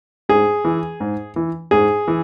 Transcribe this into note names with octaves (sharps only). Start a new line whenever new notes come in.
G#2 G#4
E3
G#2
E3
G#2 G#4
E3